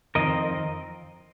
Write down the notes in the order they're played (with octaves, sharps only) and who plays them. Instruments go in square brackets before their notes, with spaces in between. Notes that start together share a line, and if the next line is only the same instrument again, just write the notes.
[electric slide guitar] F2 D#3 C4 A#4 D#5